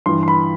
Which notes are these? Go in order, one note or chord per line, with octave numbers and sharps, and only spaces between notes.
G2 E3 C6
C6
B5